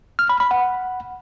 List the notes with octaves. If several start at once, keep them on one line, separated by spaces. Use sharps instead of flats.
F6
B5
B5
F#5